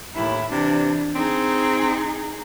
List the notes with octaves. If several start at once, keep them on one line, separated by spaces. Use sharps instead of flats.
D#2 A2 E4
C3 E3 D4
C4 D#4 G#4